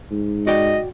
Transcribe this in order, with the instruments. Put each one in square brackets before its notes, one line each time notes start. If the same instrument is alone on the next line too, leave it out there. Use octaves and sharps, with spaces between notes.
[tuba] G#2
[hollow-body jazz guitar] F#4 D5 G5 [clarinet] D#5